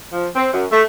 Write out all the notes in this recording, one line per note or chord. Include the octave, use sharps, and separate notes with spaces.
F3
C4
F#2
A3